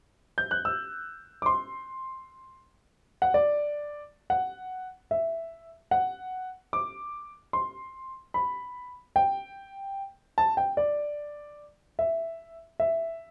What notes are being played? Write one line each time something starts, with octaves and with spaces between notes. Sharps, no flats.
G6
F#6
E6
D6
C6
F#5
D5
F#5
E5
F#5
D6
C6
B5
G5
A5
G5
D5
E5
E5